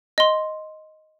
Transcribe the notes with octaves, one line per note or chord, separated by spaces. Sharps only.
D#5 C6